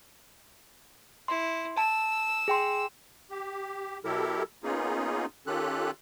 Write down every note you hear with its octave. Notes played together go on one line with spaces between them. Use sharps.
E4 C6
A5 E6
G#4 G5 C6
G4
B2 F#3 E4 G4 A4 A#4
A#3 B3 C#4 D#4 F4 G#4
D#3 C#4 F4 G4 A4 F#6